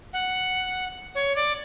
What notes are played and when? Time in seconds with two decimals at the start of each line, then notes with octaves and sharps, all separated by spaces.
0.13 F#5
1.15 C#5
1.36 D5